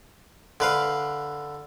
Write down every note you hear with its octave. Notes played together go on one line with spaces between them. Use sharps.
D3 B4 F5